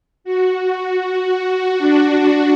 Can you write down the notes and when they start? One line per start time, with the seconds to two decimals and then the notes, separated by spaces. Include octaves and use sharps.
0.24 F#4
0.75 F#4
1.27 F#4
1.78 D4